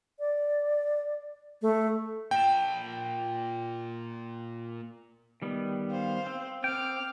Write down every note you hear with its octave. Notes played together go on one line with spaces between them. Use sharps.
D5
A3
A#2 G5 A5
D#3 G3 B3
C5 F5
C4
C4 G5 D6 F6